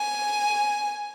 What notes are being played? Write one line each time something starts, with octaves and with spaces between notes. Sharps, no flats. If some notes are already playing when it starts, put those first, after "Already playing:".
Already playing: G#5